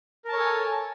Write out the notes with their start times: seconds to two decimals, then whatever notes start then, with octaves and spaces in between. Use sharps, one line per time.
0.25 A#4
0.29 A5
0.32 C#5
0.36 A4
0.40 G#5